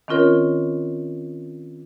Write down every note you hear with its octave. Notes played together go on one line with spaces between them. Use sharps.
D#3 C4 C#4 F4 A#4 C#5